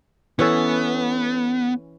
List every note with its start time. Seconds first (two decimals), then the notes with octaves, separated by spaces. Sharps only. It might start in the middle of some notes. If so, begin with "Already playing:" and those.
0.39 E3 B3 C#4 A4